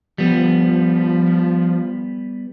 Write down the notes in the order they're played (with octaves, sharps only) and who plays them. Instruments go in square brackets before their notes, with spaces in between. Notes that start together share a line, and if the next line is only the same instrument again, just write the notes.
[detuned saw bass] F3 [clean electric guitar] G3 B3